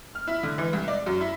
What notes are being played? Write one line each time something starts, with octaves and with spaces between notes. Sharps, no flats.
F6
E4
D3
E3
C2
D5
F#2
E4